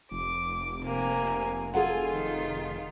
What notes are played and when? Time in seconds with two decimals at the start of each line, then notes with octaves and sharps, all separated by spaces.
0.11 F1 D6
0.81 C3 A#3 G#5
1.74 F4 G#4 A4 F#5 G#5
2.07 D#3 F4